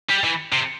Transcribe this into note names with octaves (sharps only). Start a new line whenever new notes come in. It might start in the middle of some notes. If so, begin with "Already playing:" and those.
G3
E3
C3